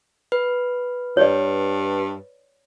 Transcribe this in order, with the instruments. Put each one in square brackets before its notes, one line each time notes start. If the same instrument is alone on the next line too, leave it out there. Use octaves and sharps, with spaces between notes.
[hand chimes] B4
[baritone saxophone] G2 [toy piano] C#5 D5